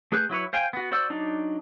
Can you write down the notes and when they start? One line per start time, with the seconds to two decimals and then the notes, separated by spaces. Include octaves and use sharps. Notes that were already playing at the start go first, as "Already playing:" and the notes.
0.12 A3 G#4 B4 F#6 G6
0.29 F#3 E4 B4 C#5
0.53 C5 F5 G5 G#5
0.73 B3 F#4
0.92 F#4 C5 D5 E6
1.10 F#3 D4 D#4 D5